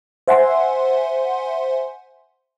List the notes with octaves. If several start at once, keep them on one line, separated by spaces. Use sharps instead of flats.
C5 E5 F#5 G#5 C6